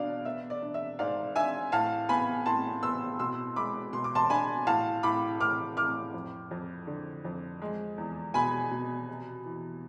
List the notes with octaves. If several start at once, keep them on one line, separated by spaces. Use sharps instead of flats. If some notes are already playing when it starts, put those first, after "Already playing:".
Already playing: B2 D4 D5 F5
B3 E5
D5
D4
E5
G#2 D5 F5
D4 E5 G#5
A2 F5 A5
B3 G#5 B5
A2 A5 C6
B3 C6 E6
B2 C6 E6
G#3 B5 D6
B2 C6
D6
A5 C6
D4 G#5 B5
A2 F5 A5
A2 B5 D6
A2 D6 F6
A2 D6 F6
F2
F2
D3
F2
G#3
E2
B2 G#5 B5
B2
C3
E3